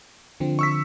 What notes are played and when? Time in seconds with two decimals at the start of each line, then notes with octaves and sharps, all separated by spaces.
0.40 D3 F3 C4
0.59 C#6 E6 B6